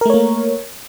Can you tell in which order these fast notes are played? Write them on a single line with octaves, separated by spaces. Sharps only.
A#4 A3 C#5 A#3